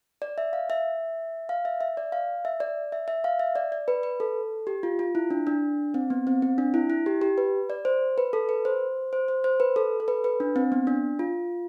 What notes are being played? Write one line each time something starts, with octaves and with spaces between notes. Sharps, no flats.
D5
E5
F5
E5
F5
E5
E5
D5
F5
E5
D5
E5
E5
F5
E5
D5
D5
B4
B4
A4
G4
F4
F4
E4
D4
D4
C4
B3
C4
C4
D4
E4
E4
G4
G4
B4
D5
C5
B4
A4
B4
C5
C5
C5
C5
B4
A4
A4
B4
B4
D4
C4
B3
D4
F4